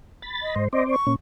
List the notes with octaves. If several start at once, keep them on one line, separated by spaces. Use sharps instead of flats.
B5 A6
D#5
G#2 C5
C4 C5 D5 D#5
C#6
A#2 C#4